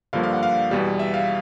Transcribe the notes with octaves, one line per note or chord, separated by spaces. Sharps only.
G2 D3 F3 A#3 F5
F5
F#5
F5
E2 B2 G3
E5
F5